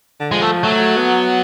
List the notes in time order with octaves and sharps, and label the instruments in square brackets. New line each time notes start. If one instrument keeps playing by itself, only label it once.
[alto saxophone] D3
[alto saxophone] F3 [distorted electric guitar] G#3
[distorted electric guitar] A3
[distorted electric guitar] F#3 [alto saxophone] A3
[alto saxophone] B3